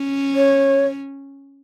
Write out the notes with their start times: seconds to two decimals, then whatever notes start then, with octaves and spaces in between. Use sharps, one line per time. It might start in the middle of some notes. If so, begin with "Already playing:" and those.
Already playing: C#4
0.35 C#5